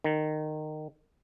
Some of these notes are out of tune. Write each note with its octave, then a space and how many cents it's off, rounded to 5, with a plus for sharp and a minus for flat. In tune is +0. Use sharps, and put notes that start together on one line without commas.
D#3 -20